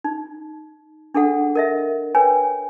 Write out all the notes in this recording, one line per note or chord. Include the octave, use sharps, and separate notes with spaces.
D#4
D4 G#4 A4 F#5
A#4 D#5 E5
B4 C#5 G5 G#5